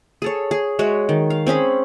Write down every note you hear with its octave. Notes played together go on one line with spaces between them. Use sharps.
G#4 A4 C#5
G#4
G#3 F#4 C#5 E5
D#3
F5
C4 C#4 G#4 B5